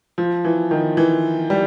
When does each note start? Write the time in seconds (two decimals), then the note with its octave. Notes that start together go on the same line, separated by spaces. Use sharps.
0.18 F3
0.45 E3
0.71 D#3
0.97 E3
1.50 G3